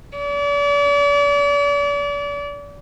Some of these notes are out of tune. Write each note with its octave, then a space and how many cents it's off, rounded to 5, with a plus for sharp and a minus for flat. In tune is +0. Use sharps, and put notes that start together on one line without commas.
D5 -40